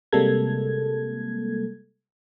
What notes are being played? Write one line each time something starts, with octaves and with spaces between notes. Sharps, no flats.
C3 G3 G#3 A#3 A4 G#6